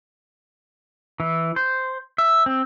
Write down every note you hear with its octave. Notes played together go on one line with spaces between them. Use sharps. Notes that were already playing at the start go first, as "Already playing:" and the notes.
E3
C5
E5
C4